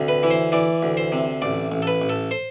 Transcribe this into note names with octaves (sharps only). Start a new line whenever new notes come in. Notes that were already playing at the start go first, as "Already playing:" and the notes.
Already playing: D2 C3
B4
E3
C5
E3 D5
D2
C5
C3
A1 D5
A1
A4
B4
A1
A4
C5